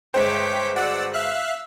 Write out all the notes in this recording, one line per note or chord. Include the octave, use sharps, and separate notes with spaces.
G1 G#3 C5 C#5 G5 D6 B6
F#4 G#4 D5 F#5 E6
E5 F5 E6 F#6